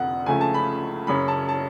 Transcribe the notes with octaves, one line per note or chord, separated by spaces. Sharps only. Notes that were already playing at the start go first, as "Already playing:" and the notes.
Already playing: F1 F2 D3 F#5
C#2 C#3 F3 A3 G#5
A5
B5
F#2 C#3 F#3 C#4 B5
A5
A5